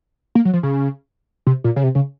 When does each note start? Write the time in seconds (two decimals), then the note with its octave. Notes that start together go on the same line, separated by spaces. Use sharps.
0.35 A#3
0.45 F#3
0.53 F3
0.63 C#3
1.47 C3
1.64 A#2
1.76 C#3
1.83 C3
1.95 C#3